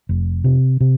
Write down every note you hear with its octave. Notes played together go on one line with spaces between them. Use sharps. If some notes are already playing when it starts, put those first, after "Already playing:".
F1
C3
C3